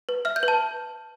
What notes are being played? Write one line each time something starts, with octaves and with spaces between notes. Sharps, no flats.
B4
E5 F6
G6
B4
A5